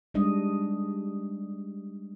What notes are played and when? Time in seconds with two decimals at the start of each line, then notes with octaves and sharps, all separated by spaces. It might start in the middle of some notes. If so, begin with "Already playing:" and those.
0.14 G3 G#3 D4 D#5